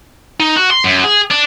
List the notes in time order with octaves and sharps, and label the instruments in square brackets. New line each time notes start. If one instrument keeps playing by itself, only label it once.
[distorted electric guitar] D#4
F#4
C6
F#2
G#4
D4